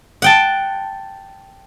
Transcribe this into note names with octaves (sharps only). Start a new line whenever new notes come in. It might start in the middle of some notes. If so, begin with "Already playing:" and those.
F#5 G5 A5